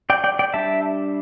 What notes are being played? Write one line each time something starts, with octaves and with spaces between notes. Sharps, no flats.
D5 G5
D5 G5
D5 G5
G3 D4 E5 A5